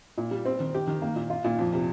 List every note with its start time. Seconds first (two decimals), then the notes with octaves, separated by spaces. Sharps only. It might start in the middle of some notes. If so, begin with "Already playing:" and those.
0.18 A#2
0.31 G3
0.45 C4
0.60 D#3
0.75 G4
0.87 D#3
1.02 A#3
1.16 A#2
1.30 F4
1.44 A#2
1.59 F2
1.73 C3